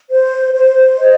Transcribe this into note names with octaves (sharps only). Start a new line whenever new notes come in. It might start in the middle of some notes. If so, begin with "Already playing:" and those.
C5
C5
D#5